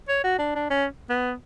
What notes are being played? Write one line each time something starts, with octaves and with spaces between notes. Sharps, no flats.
C#5
F#4
D4
D4
C#4
B3